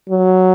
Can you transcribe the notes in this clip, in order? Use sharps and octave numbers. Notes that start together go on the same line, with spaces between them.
F#3